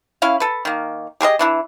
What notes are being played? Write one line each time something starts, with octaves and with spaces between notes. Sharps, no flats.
C#4 E4 F5
A4 B4
D#3 A#3
G4 G#4 A#4 D#5
E3 D4 E4